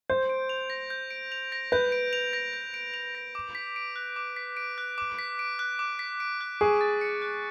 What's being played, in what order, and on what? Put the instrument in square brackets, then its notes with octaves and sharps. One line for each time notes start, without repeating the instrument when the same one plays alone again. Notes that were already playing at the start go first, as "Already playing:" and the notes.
[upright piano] C5 [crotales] G6
[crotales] D7
F7
A#6
G6
D7
F7
A#6
[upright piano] B4 [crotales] G6
[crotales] D7
F7
A#6
G6
D7
F7
A#6
D6
B6
D7
F#6
D6
B6
D7
F#6
D6
B6
D7
F#6
D6
B6
D7
F#6
[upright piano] G#4 [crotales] C#6
[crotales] A6
C#7
F#6